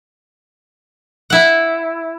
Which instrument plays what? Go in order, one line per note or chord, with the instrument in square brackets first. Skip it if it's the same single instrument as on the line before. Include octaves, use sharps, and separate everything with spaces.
[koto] E4 F#5